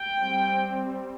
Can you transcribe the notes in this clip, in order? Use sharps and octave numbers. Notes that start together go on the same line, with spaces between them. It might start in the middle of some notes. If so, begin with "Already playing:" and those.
Already playing: G5
G3 C4